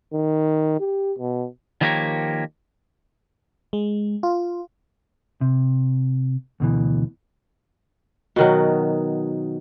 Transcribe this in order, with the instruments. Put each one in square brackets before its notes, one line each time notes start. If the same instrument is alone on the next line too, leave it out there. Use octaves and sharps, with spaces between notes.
[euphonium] D#3
G4
B2
[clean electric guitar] D#3 F3 A#3 G4 A#4 C#5
[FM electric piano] G#3
F4
[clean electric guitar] C3
D2 B2 E3
[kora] B2 D#3 F#3